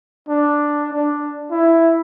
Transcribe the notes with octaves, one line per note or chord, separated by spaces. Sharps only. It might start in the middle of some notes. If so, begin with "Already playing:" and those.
D4
D4
E4